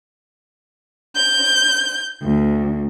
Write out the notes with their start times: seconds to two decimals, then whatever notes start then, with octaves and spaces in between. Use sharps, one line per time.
1.16 G6
2.23 D2